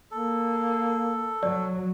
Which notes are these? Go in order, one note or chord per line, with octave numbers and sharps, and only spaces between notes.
A#3 A4
F#3 D5